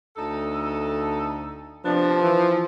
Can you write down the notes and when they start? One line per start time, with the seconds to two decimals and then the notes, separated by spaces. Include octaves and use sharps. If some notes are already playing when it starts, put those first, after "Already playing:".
0.16 D2 D#4 A4
1.85 C3 F3 B3 D4
2.22 E3